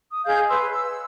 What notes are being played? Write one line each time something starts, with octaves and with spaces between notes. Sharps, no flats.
D#6
G#4 D#5 F5 G6
B4 C#5 C6 E6
E6